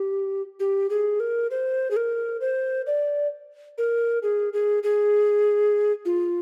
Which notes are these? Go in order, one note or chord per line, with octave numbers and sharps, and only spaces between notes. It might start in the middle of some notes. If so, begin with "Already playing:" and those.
Already playing: G4
G4
G#4
A#4
C5
G#4
A#4
C5
D5
A#4
G#4
G#4
G#4
F4